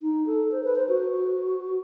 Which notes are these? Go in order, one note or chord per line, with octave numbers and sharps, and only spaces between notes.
D#4
A4
C5
B4
C5
F#4